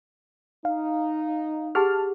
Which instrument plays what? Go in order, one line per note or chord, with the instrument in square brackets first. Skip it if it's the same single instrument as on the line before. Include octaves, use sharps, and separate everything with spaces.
[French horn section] D#4 [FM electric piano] F5
[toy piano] G4 G#4 F#5 [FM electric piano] A5 F6